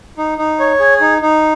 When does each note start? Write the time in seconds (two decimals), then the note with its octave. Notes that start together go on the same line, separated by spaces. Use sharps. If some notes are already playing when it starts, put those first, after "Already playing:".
0.18 D#4
0.38 D#4
0.60 C#5
0.80 G#4
1.01 D#4
1.22 D#4